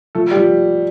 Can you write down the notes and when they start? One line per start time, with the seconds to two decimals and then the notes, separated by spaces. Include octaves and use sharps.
0.15 F3 A3 A4
0.31 G3 G4
0.36 F3